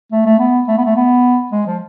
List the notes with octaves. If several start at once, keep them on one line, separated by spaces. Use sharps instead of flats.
A3
A3
B3
A3
B3
A3
B3
G#3
F3